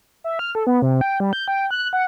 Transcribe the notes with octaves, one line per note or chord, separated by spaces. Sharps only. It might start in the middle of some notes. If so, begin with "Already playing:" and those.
E5
F6
A4
B3
C3
G5
G3
G6
G5
F#6
F#5